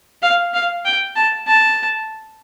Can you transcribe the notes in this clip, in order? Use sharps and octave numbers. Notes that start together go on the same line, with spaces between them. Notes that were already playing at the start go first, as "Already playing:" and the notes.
F5
F5
G5
A5
A5